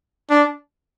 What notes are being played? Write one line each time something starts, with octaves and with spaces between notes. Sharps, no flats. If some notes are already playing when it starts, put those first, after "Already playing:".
D4